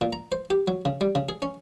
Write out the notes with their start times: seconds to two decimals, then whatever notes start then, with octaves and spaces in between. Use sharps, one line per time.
0.01 A#2
0.13 A#5
0.32 C5
0.50 G4
0.68 F#3
0.85 C#3
1.01 G3
1.15 C#3
1.29 G#4
1.42 C#4